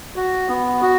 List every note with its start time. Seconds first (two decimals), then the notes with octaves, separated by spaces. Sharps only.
0.16 F#4
0.49 B3
0.82 F#4